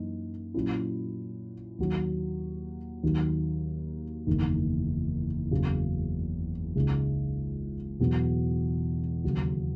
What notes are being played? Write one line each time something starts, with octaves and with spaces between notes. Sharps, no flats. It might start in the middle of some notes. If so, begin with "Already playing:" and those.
Already playing: F#2 E3 A#3 D#4
A#2 F#3 C#4 E4
D#2 D#3 F#3
D#2 D#3 F#3
F#1 E2 D#3
F#1 E2 C#3 F#3
C#2 C#3 G#3 D#4
E2 B2 F#3
D#2 C#3 F#3